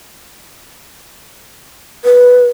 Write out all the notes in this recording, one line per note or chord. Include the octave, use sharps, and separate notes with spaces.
B4